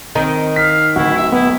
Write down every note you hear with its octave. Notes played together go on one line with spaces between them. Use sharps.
D#3 C4 A#5
F5 B6
D1 E4 F#4
E5
B3 E4